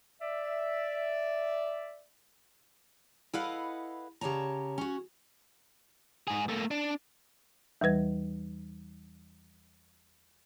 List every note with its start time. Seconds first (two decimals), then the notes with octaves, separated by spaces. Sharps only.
0.22 D5 E5
3.33 E4 A4 B4 D#5 F5 F#5
4.21 C#3 G4 C#5 A5 A#5
4.78 C#4 F#4
6.28 G#2 G#4
6.49 A3 A#3
6.71 D4
7.81 E2 E3 G3 B4 G#6